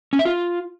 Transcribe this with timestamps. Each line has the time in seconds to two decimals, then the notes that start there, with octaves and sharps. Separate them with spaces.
0.13 C#4
0.19 E5
0.25 F4